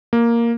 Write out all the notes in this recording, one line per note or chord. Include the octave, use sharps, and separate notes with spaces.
A#3